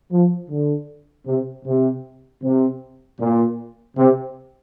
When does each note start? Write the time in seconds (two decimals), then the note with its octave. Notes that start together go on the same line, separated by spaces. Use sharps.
0.11 F3
0.50 D3
1.27 C3
1.65 C3
2.43 C3
3.20 A#2
3.97 C3